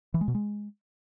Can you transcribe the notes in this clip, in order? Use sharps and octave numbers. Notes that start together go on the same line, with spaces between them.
E3
G#3
B2
G#3